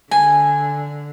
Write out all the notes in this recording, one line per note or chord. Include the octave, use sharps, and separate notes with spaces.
D3 G#5